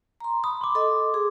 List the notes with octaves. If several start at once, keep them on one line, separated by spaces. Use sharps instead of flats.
A#5 C6
B5 D#6
C6 D6
A4 D#5
G#4